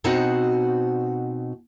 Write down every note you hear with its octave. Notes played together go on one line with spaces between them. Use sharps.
B2 C4 D#4 F#4 C5 F#5